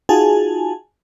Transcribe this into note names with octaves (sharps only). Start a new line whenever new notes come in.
D#4 F4 F#4 G#4 G#5 A5